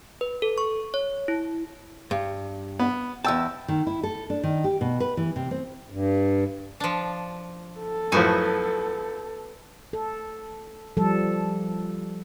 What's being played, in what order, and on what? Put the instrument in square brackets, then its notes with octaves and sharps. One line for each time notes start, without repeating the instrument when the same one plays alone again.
[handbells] B4
A4
C#6
C#5
E4
[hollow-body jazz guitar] G2
[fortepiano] B3
[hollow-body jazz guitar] E2 A5 [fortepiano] G5 E6
[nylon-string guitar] D#3
E4
A4
D4
D#3
G4
B2
B4
E3
C3
C4
[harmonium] G2
[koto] F3 D4
[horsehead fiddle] A4
[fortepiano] F#2 A2 F3 [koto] B3 F#4 G#5
[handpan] A4
F3 G3 A4